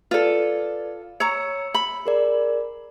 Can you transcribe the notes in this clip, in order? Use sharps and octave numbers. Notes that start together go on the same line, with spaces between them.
F4 A4 B4 D5
C#5 A#5 E6 C#7
B5
G#4 A#4 D5